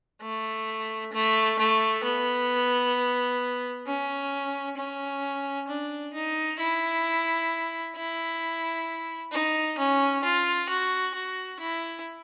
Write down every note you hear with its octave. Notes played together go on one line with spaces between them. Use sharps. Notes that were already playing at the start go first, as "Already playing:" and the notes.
A3
A3
A3
B3
C#4
C#4
D4
D#4
E4
E4
D#4
C#4
F4
F#4
F#4
E4